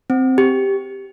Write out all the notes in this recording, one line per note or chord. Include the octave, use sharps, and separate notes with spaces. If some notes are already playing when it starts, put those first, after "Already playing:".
C4
G4